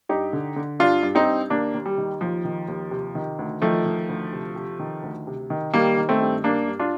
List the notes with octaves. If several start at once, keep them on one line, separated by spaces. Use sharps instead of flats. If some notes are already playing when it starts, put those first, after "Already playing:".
G2 D#4 G4
D3
D3
G2 D4 F4
G2
C4 D#4
G2
D#2 A#3 D4
D#2
G3
D#3
D#2 F3
D#3
D#2
C3
D#3
D2
D#3 F3 A3
D#3
D2
C3
C3
D#3
D2
C3
D#3
D#3 G3 A#3
D#3
A3 C4
G2
G2 A#3 D4
G2
D4 F4